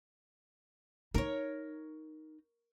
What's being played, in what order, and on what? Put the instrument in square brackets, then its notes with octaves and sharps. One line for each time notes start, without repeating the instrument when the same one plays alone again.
[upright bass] D#4 [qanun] A#4 C#5